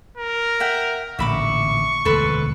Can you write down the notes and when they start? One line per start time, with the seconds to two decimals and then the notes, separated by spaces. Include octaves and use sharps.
0.17 A#4
0.60 E5 F#5 G5
1.19 A1 A#2 D3 E5 B5 C#6 D6
2.05 E1 D2 A4 B4 C5